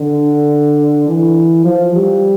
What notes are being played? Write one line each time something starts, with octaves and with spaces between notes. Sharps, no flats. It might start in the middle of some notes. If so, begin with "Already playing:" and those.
Already playing: D3
E3
F3
G3